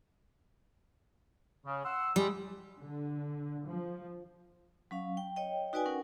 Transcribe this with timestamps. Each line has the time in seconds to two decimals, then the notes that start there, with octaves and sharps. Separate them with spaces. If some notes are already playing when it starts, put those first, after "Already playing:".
1.65 C#3
1.84 F#5 C6 E6
2.16 G3 G#3
2.78 D3
3.65 F3
4.91 F#3 C#4 F5
5.17 G5
5.36 C#5 D#5 G5
5.73 D#4 F#4 B4 D5 G5 G#5
5.86 C#4 A#4 F#5